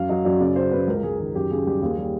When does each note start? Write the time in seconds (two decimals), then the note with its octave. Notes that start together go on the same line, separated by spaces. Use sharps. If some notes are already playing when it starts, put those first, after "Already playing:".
Already playing: F#2 F5
0.09 F#3 D#5
0.25 F#2 D5
0.40 C#3 D5
0.56 C#3 C5
0.71 C#3 B4
0.87 C#2 A#4
1.03 C#2 G#4
1.20 D#3 G#4
1.35 F#2 G4
1.50 C#3 G#4
1.66 G3 G4
1.82 D#2 G#4
1.98 G3